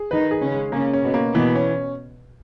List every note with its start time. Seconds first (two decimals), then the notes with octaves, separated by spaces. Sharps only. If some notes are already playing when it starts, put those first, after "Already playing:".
Already playing: G#4
0.11 D#3 D#4 B4
0.31 G#4
0.41 C#3 C#4
0.52 G#3
0.72 C#3 A#3 C#4
0.93 C#4
1.03 B2 B3
1.14 A#3
1.34 B2 E3 B3
1.55 C#4